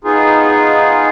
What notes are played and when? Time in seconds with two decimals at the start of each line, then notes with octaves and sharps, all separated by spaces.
0.04 B3 D#4 F4 G#4